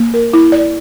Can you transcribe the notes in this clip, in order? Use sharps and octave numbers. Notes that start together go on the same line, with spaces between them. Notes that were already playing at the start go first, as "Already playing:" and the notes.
Already playing: A#3
A#4
E4
D5